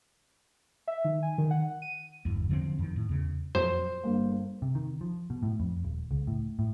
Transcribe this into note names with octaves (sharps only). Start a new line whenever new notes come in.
E5
D#3
G#5
D#3
F#5
D#7
G1 E2
D3 F3 F#3 C4
F2 D#3
A2
E2 C#3
F2 A#2 F#3 C5
G1 A#3
C3
D#3
F3
B2
A2
F2
D#1
C#2
A2
A2